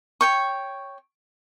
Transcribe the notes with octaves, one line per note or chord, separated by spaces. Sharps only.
C#5 G5 C#6